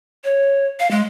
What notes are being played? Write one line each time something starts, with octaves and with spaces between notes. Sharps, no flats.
C#5
F5
G#3